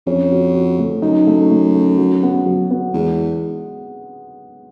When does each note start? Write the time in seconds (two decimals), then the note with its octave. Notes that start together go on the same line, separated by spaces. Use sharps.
0.07 F2 C#4
0.32 F#4
0.55 F#4
0.79 A3
1.02 F#2 D#4
1.27 A3
1.51 A3
1.75 A3
1.98 F#3
2.23 B3
2.46 F#3
2.71 B3
2.94 E2 G#3